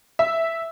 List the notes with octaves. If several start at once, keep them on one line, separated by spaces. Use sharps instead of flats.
E5